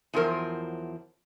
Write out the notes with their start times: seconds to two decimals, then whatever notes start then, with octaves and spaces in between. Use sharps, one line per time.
0.14 E2 F3 F#3 A#4 C5